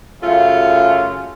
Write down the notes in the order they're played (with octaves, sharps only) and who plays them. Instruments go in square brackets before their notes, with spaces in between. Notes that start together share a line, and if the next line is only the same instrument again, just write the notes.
[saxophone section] F#2 C#3 A3 F4